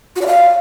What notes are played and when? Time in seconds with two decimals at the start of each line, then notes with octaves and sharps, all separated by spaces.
0.16 F#4
0.21 D5
0.27 F5